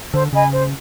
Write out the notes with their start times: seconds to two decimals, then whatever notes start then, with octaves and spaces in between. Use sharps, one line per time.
0.14 D3 C5
0.33 C#3 D#5 G#5 B5
0.52 C5